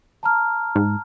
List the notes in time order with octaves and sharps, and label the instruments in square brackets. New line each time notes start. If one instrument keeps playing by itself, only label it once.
[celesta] A5 A#5 F6
[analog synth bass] G#2